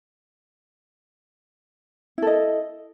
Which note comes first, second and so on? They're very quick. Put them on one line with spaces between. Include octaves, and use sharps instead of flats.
E4 A4 D#5